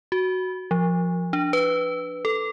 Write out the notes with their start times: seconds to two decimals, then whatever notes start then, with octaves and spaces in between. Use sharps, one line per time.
0.12 F#4
0.71 F3
1.33 D4
1.53 B4
2.25 A4